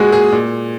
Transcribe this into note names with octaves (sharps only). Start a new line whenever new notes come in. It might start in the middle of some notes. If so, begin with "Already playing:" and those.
Already playing: A#2 G#3 F#4 G#4
G#4
A#2